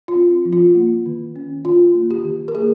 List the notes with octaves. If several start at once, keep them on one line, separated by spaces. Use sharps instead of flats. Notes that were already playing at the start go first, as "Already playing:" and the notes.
F4
C4
F3
F4
A#3
D#3
C#4
D#3 F4
A#3
G4
D#3
A#4
A#3 G#4